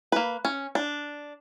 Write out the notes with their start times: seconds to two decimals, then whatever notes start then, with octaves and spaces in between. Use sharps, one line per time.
0.12 A#3 B4
0.45 C#4
0.75 D4